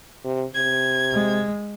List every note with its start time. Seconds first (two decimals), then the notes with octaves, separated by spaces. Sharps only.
0.24 C3
0.55 C3 G#6
1.13 G#3